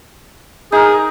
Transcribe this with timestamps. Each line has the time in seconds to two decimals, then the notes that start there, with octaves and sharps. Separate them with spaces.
0.72 D#4 G#4 A#4